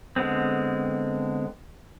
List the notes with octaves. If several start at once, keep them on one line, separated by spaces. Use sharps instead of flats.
D3 G#3 B3 C4